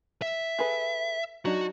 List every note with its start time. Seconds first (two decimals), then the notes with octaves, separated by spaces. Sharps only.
0.22 E5
0.59 G#4 A4 B4
1.45 F#3 D4 D#4 F#4